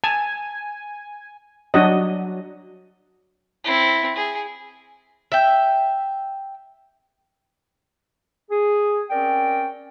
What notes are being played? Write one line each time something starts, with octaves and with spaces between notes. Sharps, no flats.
G#5 A5
F#3 D4 F#4 D#5
C4 E4
G#4
E5 G5
G#4
C4 C#4 A#4 D5 G5